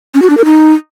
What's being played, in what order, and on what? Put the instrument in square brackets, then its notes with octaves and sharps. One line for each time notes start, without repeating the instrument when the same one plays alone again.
[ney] C#4
F#4
D4
A#4
D#4